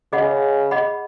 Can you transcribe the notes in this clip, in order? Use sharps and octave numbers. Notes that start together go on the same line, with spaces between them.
C#3 G#4 D#5 F#5 B5
G#4 D#5 F#5 B5